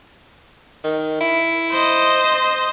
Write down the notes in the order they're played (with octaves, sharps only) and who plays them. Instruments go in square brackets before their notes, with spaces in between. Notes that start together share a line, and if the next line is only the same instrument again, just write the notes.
[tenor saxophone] D#3
E4
[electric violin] C5 D#5